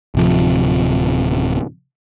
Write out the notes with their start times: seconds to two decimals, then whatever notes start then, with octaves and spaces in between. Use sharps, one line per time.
0.15 D1 C3 F3